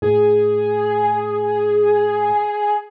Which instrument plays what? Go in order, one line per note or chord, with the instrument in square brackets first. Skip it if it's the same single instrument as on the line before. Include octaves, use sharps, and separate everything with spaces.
[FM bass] A2 [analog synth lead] G#4